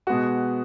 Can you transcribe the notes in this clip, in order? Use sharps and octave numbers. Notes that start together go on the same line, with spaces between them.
B2 G#3 B3 F#4